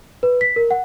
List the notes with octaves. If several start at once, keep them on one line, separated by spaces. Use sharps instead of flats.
B4
B6
A#4
F#5